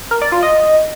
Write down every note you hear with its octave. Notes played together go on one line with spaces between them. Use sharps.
A#4
D5
F4
D#5